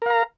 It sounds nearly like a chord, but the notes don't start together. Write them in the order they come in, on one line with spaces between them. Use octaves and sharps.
A#4 F5 A#5